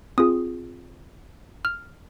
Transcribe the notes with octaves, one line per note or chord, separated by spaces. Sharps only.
C4 F4 G#4 D#6
F6